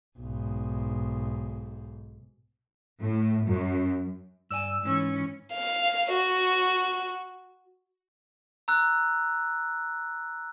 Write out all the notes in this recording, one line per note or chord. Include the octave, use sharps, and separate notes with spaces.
B1 G#2
A2
F#2
G2 D5 G#5 E6
G#2 E3 C#4
F5
F#4
A#5 E6 F#6